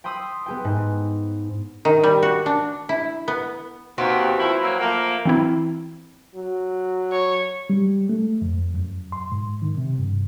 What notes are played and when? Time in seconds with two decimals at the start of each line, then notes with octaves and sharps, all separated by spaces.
0.04 G5 B5 C6 D#6 E6
0.46 B3 G#4 G5
0.64 G#2
1.85 D#3
2.03 G3
2.23 F#4
2.46 D4
2.89 E4
3.28 B3
3.98 D#2 B3 C4 F#4
4.38 F3 E4
4.62 F#3 A#3
4.79 F3 A3 A#3
5.25 E3 C4 E4
6.35 F#3
7.12 C#5
7.70 G3
8.09 A3
8.42 F2
8.74 F#2
9.12 C6
9.32 G#2
9.62 D#3
9.77 C3
9.99 G2